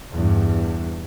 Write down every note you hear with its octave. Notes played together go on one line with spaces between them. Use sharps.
E2 G2